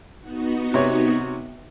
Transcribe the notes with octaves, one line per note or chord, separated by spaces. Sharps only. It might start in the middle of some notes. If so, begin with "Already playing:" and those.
B3 D#4 F#4
C3 C#5